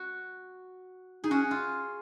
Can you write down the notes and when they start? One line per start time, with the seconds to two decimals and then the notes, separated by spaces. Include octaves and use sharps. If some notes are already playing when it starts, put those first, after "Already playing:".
Already playing: F#4
1.24 D#4 G#4
1.31 C#4 F#4
1.51 F4